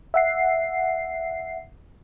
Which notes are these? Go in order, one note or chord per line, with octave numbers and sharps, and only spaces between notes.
E5 F#5 C7